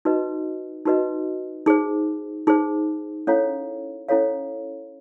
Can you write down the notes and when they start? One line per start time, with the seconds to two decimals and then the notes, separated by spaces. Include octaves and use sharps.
0.05 D#4 F#4 B4 D#5
0.86 D#4 F#4 B4 D#5
1.66 D#4 G#4 C5
2.47 D#4 G#4 C5
3.27 C#4 E4 A4 C#5 F5
4.09 C#4 E4 A4 C#5 F5